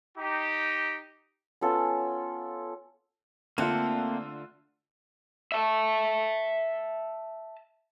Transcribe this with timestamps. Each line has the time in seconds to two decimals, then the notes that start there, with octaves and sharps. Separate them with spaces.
0.18 D#4 G4
1.61 B3 C#4 F4 A4
3.58 D3 A3 A#3 C4 F4 F#5
5.52 E5 A5